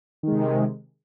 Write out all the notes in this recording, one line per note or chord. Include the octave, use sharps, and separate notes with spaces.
C3 D#3 G#3